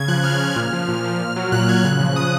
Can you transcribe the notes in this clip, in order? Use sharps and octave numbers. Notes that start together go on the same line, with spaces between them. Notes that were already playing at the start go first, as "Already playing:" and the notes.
Already playing: C#3 G#6
F3 F#6
C#3 F6
F3
A#2
F3
A#2
F3
A#2
F#3
A#2 F#6
F#3 G#6
C#3 F#6
F3
C#3 D#6